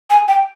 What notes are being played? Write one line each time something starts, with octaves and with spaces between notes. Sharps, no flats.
G#5
G5